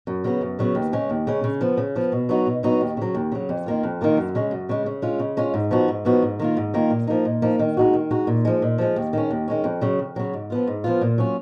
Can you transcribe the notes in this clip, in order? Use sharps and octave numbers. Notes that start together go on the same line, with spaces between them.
F#2
C#3 F#3 B3
F#2
C#3 F#3 B3
D#2
C#3 G#3 C#4
D#2
C#3 G#3 C#4
C#3
F3 B3
C#3
F3 B3
B2
F#3 B3 D#4 F#4
B2
F#3 B3 D#4 F#4
D#2
C#3 F#3
D#2
C#3 F#3
F2
D#3 A#3 F4
F2
D#3 A#3 F4
F#2
C#3 G#3
F#2
C#3 G#3
C#3
G#3 C#4 F4
C#3
G#3 C#4 F4
G#2
F3 B3 D#4 F#4
G#2
F3 B3 D#4 F#4
G#2
D#3 A#3 F4
G#2
D#3 A#3 F4
A#2
F3 A#3 D#4
A#2
F3 A#3 D#4
D#3
G#3 D#4 F#4
D#3
G#3 D#4 F#4
A#2
F3 G#3
A#2
F3 G#3
D#2
D#3 G#3 C#4
D#2
D#3 G#3 C#4
F2
C#3 F#3
F2
C#3 F#3
G#2
F3 B3 F4
G#2
F3 B3 F4
A#2
F#3 C#4 F4